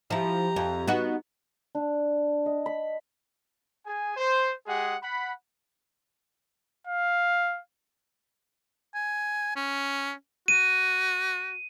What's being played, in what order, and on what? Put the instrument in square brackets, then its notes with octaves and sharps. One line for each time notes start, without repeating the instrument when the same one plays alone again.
[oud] F3 E4 [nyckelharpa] G4 A#5
[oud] F2
B3 D#4 F#4
[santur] D4
D#5
B5
[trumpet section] G#4 G#5
C5
G#3 G4 G#4 F#5
F#5 B5
[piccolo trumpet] F5
[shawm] G#5
C#4
[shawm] F#4 [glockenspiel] D#7